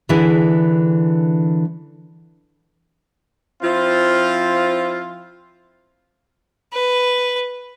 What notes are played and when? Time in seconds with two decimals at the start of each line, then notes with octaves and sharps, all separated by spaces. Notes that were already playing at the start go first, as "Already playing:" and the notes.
0.09 D3 E3 D4 E4 G#4
3.62 F3 C4 E4 F4
6.73 B4